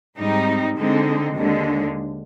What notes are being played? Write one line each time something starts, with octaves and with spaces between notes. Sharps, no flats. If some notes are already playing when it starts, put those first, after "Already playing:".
G#2 G3 C4 D#4
D3 G#3 C4 D#4
D#2 D3 G#3